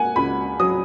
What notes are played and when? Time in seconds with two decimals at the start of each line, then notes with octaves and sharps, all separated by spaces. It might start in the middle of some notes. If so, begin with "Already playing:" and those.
Already playing: A#3 F#5 G#5
0.16 C#2 B5
0.60 F#3 D#6